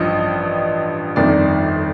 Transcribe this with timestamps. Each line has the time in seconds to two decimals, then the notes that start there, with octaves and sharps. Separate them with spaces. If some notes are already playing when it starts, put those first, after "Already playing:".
Already playing: A1 G2 F3 D#5
1.16 G1 F2 D#3 D5